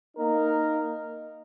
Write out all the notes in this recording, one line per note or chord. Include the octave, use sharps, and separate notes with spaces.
A#3 D#4 A#4